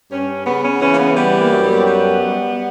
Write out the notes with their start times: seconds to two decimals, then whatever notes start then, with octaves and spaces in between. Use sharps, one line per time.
0.11 G2 C#4
0.45 C#3 B3
0.64 C#4
0.81 E3 C#4
0.93 A#3
0.98 B3
1.15 G3 B3
1.39 A#3
1.51 F#2
1.62 B3
1.85 G3
2.20 G3